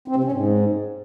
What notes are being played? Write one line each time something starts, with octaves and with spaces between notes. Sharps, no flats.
C4
C3
C#4
G#2